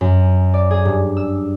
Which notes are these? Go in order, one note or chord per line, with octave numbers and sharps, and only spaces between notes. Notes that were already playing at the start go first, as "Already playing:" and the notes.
F#2
D5
G#4
G2
E6